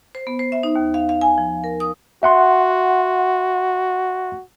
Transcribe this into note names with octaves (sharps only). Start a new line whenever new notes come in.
C5
B3
C5
E5
D#4
D#2
F5
F5
G#5
F3
A#4
D#6
F#4 E5 F#5 C6